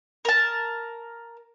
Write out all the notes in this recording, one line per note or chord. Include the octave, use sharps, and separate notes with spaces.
A#4 A5